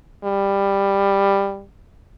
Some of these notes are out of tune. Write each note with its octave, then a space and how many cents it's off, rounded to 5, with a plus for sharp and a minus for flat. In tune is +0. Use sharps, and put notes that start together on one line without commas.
G3 +10